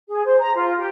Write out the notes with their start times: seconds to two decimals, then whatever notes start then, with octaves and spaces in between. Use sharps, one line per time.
0.10 G#4
0.25 C5
0.39 A#5
0.55 F4
0.78 G4